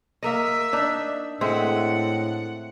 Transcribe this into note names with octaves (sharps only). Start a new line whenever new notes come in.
A#3 A#4 D#5 E5
D4 D#4
A2 G#3 C4 E5 F#5